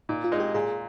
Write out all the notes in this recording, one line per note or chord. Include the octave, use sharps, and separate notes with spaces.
A#2 D#4
F4
G#3 D#4
G4
A#2 G#4